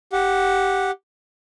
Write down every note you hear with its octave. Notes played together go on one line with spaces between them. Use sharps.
G4 F#5